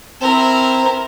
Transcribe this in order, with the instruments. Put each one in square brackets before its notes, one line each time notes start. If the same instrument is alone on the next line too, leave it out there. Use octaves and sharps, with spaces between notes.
[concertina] C4 [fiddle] E4 A#4